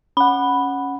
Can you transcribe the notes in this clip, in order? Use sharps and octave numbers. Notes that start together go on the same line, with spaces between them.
C#4 F#5 B5